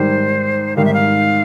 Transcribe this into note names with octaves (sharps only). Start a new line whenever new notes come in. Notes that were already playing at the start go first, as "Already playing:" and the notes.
Already playing: G#2 D#3 G3 C5
G#2 D#3 G3 F5
E5
F5